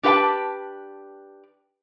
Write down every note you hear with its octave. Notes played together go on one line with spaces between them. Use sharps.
D4 G4 B4 F#5 G5 A5